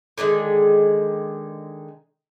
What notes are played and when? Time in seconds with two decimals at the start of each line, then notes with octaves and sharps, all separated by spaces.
0.18 D3 D#3 F3 G#3